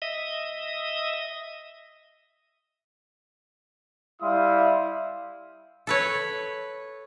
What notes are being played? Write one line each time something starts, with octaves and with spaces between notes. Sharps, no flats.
D#5 E5 D#6
G3 E4 F5 C6 D#6
A4 B4 C#5